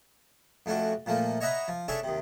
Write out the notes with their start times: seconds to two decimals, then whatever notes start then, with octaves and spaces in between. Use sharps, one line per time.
0.66 F2 A3 C#4 D4 F#4
1.06 A#2 F3 A3 A#3
1.41 C#5 D#5 E5 F#5 A#5 B5
1.68 F3
1.88 C#4 D4 G#4 A4 C#5 E5
2.03 D#2 C3